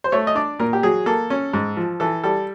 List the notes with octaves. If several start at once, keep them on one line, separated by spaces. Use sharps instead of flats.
C5
A3 C#5
D#5
D4 D5
A#2 A#4
G4
F#3 G#4
A#3 A4
C#4
G#2
F3
E3 A4
G3 A4